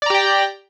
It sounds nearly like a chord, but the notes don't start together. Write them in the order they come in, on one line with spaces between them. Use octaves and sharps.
D5 A#5 G4 G5